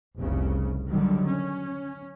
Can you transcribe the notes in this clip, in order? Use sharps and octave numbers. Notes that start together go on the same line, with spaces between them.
F1 C2 C#3
D3 D#3 F#3 G3
C#4